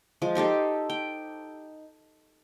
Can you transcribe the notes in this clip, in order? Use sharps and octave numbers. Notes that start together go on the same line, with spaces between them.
F3 G#3
D#4 G4 A4 C5
G5